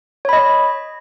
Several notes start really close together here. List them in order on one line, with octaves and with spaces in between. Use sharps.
C#5 B5 D#5